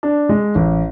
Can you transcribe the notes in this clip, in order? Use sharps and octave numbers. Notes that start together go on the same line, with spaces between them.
D4
G#3
A1